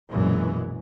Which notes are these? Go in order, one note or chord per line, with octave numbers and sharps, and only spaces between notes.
A#1 F#2 B2 E3 G#3